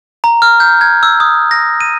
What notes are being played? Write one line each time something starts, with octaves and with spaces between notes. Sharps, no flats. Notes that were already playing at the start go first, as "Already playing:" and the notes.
A#5
F6
G6
G#6
E6
D#6
A#6
D#7